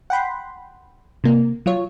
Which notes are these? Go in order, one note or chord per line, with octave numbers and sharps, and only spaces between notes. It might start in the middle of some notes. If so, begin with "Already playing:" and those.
F#5 G5 B5 C6
C3 A#3
F#3 F4 C#5